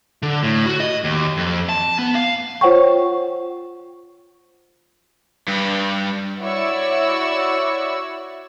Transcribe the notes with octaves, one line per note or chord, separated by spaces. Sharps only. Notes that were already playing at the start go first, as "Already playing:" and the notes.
D3
A2
F#4
D#5
D#2
F2
A5
B3
F5
F4 C5 C#5 F#5 G5 C#6
G2
E4 F#4 C#5 D5 C#6 E6